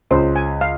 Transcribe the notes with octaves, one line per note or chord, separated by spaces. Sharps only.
C#2 C#3 C5
G#5
F5